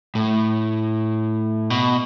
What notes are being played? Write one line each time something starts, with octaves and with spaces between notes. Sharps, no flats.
A2
B2